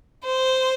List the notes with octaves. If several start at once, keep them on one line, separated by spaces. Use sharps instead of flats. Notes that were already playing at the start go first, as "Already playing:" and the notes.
C5